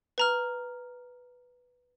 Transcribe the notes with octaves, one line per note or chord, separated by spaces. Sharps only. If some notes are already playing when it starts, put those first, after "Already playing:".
B4 A#5 F6